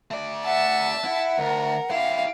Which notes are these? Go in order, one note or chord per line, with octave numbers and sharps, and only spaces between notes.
A3 D5
E5 F#5 A5
E4 F#5
D2 A#4
E4 G4 F5